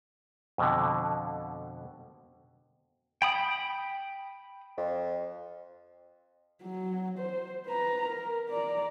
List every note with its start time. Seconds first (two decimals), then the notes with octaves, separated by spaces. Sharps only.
0.58 F2 B2 D3
3.22 G5 B5 D#6
4.78 F2
6.63 F#3
7.19 C5
7.67 B4 A#5
8.07 A#4
8.49 D5 A#5